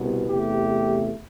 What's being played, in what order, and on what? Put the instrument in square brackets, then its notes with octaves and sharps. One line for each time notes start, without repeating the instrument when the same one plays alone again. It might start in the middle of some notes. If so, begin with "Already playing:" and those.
Already playing: [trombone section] C2 B2 B3
E2 C3 E3 A3 G4